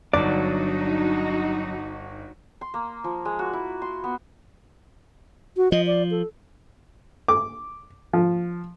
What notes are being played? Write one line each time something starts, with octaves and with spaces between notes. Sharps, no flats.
G1 F#3 D4 D#4 F#4 D5
C6
A#3
F3
G#3
F#4
E4
C6
B3
F#4
F3 D#5
D5
A4
D6
F3